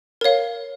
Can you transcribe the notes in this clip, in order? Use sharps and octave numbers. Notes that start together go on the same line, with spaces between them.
A#4 C#5 F5